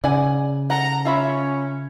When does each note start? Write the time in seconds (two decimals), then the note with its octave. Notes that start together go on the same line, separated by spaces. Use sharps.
0.04 C#3 D5 F#5 G#5
0.70 A4 F#5 A#5
1.05 C#4 F4 E5 B5